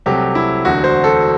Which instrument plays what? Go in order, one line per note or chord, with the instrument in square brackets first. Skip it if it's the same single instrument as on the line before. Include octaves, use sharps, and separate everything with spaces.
[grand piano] C2 C3 F#3 A3 C4 G4
E4
E1 D2 D3 F#4
C5
A4